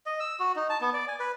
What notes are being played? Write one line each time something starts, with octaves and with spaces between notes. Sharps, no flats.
D#5
E6
F#4
D#4
A5
B3
D5
G#5
B4